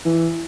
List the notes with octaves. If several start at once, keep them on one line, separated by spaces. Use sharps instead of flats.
E3